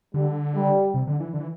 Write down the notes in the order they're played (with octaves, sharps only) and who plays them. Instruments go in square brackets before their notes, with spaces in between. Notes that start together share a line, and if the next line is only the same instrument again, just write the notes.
[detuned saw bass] D3 [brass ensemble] G3
[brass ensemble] G3
[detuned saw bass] C3
D3
E3
D3
E3